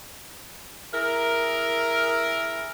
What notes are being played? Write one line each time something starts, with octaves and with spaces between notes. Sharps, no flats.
E4 G#4 A#4